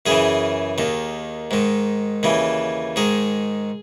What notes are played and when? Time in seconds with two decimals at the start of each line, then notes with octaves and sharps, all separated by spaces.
0.06 F#2 C#3 E3 G#4
0.78 D#2 D#3
1.51 G#2 D#3
2.23 D#2 C#3 E3
2.96 G#2 D#3 G#4